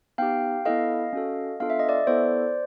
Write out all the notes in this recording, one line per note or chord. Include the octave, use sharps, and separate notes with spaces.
B3 D#4 G4 F5 G5
B3 E4 A4 D#5 F5
C#4 F#4 A4
B3 D4 F4 A4 F5
E5
D#5
D5 E5
B3 E4 A4 C5 D5